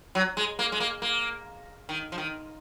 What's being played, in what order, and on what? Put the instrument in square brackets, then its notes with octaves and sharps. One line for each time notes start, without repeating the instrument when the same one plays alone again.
[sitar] F#3
G#3
A#3
G#3
A#3
A#3
D#3
F3
D#3